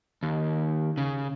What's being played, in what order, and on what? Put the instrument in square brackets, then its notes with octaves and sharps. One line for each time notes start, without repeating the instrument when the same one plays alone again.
[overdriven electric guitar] D#2
C#3